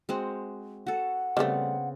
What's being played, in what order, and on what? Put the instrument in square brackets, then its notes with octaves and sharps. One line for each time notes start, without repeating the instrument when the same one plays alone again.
[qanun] G#3 C4 F#4
[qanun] F#4 A4 [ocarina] F#5
[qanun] C#3 B3 C4 [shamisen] G3 A3